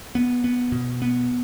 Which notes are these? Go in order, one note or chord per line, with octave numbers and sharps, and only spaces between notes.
B3
B3
B2
B3